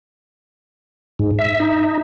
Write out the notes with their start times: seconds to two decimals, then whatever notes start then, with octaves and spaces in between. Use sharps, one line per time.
1.19 G#2
1.39 E5
1.60 D#4